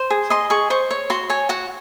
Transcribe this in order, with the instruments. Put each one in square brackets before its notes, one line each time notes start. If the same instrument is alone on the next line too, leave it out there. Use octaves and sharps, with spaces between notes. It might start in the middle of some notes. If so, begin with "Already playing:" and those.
Already playing: [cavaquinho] C5
G#4
D#5 C6
G#4 C#6
C5 C#6
C#5
F#4 C6
C#5 G#5
F#4 F#5